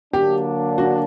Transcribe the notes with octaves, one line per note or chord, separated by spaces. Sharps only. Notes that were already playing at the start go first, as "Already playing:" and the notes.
D3 F#3 A#3 D4 G4
F#4